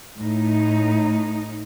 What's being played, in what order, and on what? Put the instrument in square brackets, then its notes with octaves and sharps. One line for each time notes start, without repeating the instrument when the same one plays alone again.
[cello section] A2 D#4